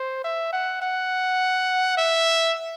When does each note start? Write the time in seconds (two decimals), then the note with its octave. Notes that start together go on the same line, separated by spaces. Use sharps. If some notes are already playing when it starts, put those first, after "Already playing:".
Already playing: C5
0.24 E5
0.53 F#5
0.82 F#5
1.97 E5